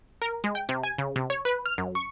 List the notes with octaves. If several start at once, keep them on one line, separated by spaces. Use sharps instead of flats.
A#4
G#3
G5
C3
G#5
C#3
C3
C#5
B4
F6
F#2
C#6